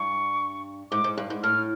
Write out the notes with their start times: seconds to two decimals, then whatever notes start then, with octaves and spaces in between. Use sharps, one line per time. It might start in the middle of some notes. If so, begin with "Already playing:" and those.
Already playing: G2 C#6
0.91 G#2 D6
1.04 G#2
1.18 G2
1.30 G#2
1.43 A2 F6